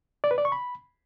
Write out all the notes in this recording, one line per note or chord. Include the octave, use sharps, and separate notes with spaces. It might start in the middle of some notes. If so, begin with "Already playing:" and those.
D5
B4
D5
C#6
B5